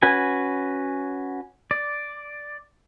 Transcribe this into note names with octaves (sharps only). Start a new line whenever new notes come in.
C#4 F#4 B4 G#5
D5